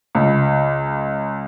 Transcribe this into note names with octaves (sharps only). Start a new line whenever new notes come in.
C#2